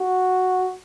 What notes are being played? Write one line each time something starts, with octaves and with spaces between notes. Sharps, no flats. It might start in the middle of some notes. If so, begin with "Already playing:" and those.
Already playing: F#4